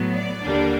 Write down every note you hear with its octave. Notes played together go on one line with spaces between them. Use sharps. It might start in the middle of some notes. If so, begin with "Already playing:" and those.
Already playing: A2 F#3 B3
D5
D#2 D3 G3 A#3 D4